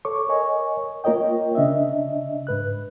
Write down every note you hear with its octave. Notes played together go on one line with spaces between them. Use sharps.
A4 C#5 C#6 D6
A#4 C#5 D#5 G#5 C#6
A#3 F4 A#4 C#5 D#5 G5
C#3 D4 D#5 E5
G#2 B4 F#6